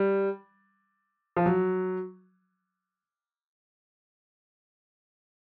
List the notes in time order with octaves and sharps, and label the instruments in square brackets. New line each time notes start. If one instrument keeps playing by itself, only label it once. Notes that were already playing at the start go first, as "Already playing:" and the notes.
Already playing: [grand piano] G3
F3
F#3